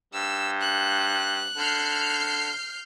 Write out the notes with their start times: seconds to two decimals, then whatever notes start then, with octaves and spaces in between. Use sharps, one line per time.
0.14 G2 E6
0.61 F#6
1.56 D3 F6 G6 C7